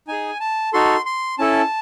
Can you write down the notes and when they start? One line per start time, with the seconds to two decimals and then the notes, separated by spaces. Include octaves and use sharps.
0.08 D#4 G#4 G#5
0.40 A5
0.73 D#4 F#4 A4 C6
1.06 C6
1.38 C#4 E4 A4 A5